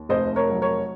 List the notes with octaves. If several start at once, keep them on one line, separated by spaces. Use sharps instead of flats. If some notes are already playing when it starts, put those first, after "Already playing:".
Already playing: D#2
F1 C5 D#5
A#4 C#5
F#3
A#4 C#5